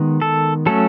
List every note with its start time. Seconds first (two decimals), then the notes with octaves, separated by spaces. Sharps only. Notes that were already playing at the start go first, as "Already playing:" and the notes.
Already playing: D#3 G#3 B3
0.22 A4
0.66 F#3 A3 C#4 A4